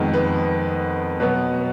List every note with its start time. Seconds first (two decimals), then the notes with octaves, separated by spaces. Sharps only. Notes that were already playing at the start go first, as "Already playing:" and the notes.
Already playing: F2 D#3 G#3 B3
0.14 B4
1.20 B2 F#3 B3 B4